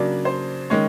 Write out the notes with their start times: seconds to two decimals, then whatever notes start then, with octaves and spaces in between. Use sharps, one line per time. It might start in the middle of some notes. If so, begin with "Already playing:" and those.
Already playing: C#3 F#3 A#3 D4 D5
0.25 C5
0.70 D#3 G#3 C#4 C#5